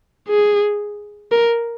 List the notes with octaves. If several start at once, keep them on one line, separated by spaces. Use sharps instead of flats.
G#4
A#4